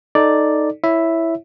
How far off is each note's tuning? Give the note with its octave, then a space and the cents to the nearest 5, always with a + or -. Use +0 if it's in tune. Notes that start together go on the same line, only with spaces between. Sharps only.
D#4 +0 A4 +0 D5 +0
E4 +0 C#5 +0 E5 +0